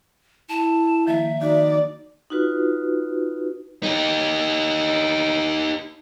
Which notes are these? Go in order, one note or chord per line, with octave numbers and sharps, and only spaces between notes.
E4 A5
D#3 F3 A#3 E5
D#3 D#4 F#4 D5
D#4 F4 F#4 B4
D#4 G4